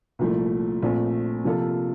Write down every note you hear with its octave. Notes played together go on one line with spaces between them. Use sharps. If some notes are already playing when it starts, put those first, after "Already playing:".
C2 A#2 F3 A3
A#1 A#2 A3 C4
C3 F3 A#3 F4 A4